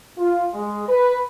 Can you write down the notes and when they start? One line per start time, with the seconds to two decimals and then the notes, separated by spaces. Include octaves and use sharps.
0.18 F4
0.54 G#3
0.89 B4